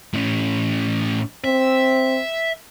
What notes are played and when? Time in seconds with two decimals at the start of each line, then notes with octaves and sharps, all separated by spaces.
0.13 A2 C#4
1.44 C4 E5